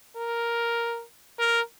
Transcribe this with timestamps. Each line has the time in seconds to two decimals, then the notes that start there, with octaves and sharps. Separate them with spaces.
0.17 A#4
1.39 A#4